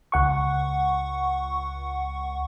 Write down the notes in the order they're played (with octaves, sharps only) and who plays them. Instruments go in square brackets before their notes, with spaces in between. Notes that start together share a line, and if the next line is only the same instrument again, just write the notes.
[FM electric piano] C#2 F#5 C#6